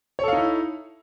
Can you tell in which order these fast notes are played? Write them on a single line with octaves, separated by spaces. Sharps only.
C#5 A4 F5 D#4 E4